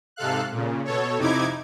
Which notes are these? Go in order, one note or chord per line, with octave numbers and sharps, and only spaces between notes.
G#2 C3 A4 F5 F#6
A#2 C#3
B2 A4 C#5
F2 C3 D#4 E4 D6 G#6